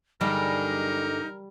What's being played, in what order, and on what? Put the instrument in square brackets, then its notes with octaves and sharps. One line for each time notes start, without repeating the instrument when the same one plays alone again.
[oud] G2 D3 G#3 [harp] G3 [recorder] D#4 [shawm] A#4